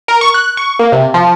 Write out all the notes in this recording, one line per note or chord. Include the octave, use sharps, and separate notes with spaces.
A#4
C#6
F#6
C#6
A#3
C3
F3